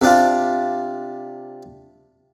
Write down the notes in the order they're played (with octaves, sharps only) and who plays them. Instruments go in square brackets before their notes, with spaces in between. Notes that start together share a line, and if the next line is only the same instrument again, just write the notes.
[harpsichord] C3 D4 F4